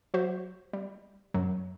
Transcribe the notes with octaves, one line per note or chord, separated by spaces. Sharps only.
F#3 F#4 C5 E5
G3
F#2 F#3